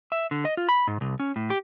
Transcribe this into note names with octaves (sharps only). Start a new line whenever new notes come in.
E5
D3
D#5
F4
B5
G#2
C2
C#4
A2
G4